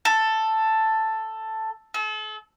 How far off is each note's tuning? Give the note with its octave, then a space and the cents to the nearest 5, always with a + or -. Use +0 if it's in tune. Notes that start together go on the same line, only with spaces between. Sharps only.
A4 +5
A4 -40